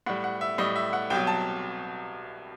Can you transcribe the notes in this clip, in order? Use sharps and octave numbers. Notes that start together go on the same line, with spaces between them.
A2 G3 F#5
F#5
E5
A2 G3 D#5
E5
F#5
C2 B2 F#3 G5
A5